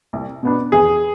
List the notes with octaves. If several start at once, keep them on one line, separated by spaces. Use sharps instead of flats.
C2
B2 B3 D4
E2 G#4